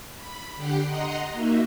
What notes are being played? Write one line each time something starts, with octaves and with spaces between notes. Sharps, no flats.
B5
D3 G4 F#5 G5 C7
D#5 F#5 A#5 C6
A#3 D#4 F#4 E5